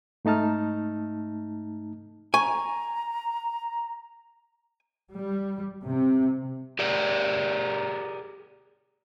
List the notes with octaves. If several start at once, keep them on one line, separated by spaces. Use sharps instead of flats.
G#2 A3 D#4 A5 F6
G#5 A#5 C#6
G3
C3
G4 G#4 A#4 D5